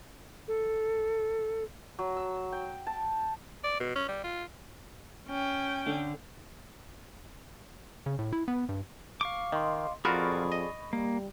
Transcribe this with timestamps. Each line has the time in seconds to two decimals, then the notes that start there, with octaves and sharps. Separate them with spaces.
0.48 A4
1.99 F#3
2.17 E6
2.52 G5
2.87 A5
3.64 D5
3.80 B2
3.96 C#4
4.08 G3
4.24 F4
5.28 C#4 G5
5.87 D3
8.06 C#3
8.19 A2
8.32 E4
8.48 B3
8.69 G2
9.21 F5 C#6 D6
9.52 D#3 D#5 C6
10.05 F2 F4 F#4 G#4 A#4 D5 B5 C#6
10.52 D#5
10.93 G3 A#3